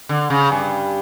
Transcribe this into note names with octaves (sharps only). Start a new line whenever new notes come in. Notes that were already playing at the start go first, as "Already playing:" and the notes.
D3
C#3
G2